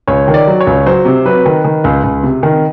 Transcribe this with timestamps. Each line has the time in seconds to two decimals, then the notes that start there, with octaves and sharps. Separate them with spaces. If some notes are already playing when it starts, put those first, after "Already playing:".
0.08 C#2 C#5
0.28 D#3
0.34 D5
0.48 F#3
0.60 C#5
0.67 C#2
0.86 F#3 C5
1.05 C3
1.25 F#3 B4
1.46 D#3
1.65 D#3
1.84 C#2
2.04 C#2
2.23 C3
2.43 D#3